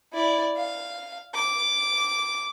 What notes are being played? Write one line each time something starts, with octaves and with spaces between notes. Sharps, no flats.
E4 D5
F5
D6